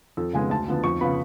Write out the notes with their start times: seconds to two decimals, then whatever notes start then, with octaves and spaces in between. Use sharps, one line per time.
0.17 F2 A4
0.33 C#3 G#3 B3 G#5
0.50 D2 A5
0.68 D3 F3 B3
0.84 F2 C#6
1.01 C#3 F3 B3 B5